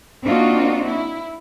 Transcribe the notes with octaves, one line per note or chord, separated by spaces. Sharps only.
A#3 C4 D4 D#4 F4 F#4
E4